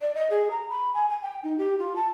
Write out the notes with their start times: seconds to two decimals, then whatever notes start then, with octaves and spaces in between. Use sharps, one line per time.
0.01 D5
0.15 D#5
0.30 G#4
0.51 A#5
0.69 B5
0.94 G#5
1.09 G#5
1.22 G5
1.43 D#4
1.58 G4
1.79 F4
1.96 A5